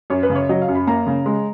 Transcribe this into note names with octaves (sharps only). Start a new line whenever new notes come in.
F#2 C#5
B4
C#3
C#5
F#3 D#5
F5
F#2
B5
A#3 A#5
C#3
G#3